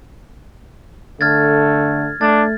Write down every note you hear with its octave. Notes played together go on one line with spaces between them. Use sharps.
D3 A3 F6 G#6 A6
A3 D4 A6